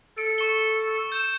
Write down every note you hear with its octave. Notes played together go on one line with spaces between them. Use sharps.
A4 D7
C#6 C#7 G7
G6 E7